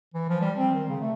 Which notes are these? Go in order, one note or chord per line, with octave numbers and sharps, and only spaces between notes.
E3
F3
G3
C4
D#3
C#3
A3